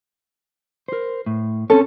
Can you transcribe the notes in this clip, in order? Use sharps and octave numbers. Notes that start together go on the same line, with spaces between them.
A#4 C5
A2
C4 C#4 A4 C#5